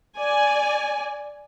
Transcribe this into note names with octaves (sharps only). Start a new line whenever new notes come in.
D5 G#5